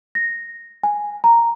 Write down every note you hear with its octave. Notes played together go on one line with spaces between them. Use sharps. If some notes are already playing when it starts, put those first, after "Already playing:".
A#6
G#5
A#5